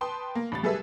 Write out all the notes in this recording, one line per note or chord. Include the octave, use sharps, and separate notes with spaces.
B4 G5 A5 C6 D#6
A#3
A1 B5 A6
G3 G#4 A4 B4 E5